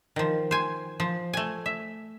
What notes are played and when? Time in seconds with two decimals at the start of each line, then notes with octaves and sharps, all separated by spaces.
0.16 D#3 F3
0.51 C5 G#5
1.00 F3
1.33 A3 G#5
1.66 E5